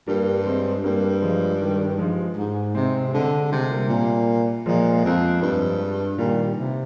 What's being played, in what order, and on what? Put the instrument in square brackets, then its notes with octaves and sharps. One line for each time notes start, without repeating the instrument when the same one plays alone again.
[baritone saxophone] G2 [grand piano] G3 A#3
[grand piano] G#3 C4
[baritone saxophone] G2 [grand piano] G3 A#3
[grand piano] F3 G#3
D#3 G3
F3 G#3
[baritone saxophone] G#2
[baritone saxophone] C3 [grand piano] G#3 C4
[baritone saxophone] D3 [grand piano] G#3 C4
[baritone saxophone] C3 [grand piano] G#3 C4
[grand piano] G3 A#3
[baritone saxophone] A#2
[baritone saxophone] A#2 [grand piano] F3 G#3
[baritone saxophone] F2
G2
[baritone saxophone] A#2 [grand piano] D#3 G3
[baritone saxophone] C3